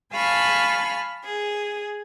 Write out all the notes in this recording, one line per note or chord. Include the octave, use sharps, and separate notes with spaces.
F5 G#5 A5 B5 C#6 F6
G#4